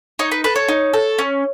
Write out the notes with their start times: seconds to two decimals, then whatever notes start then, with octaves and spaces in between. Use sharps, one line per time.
0.19 D#4 C#5
0.32 B4
0.44 A4 B4
0.56 C#5
0.68 D#4
0.94 A4
1.18 C#4